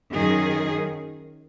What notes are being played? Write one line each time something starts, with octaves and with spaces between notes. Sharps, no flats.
F#2 D#3 G#4